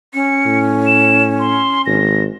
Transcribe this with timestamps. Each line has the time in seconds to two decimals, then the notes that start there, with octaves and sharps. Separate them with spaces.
0.14 C#4 C#7
0.46 A2
0.87 E7
1.39 C6
1.86 G#1 A#6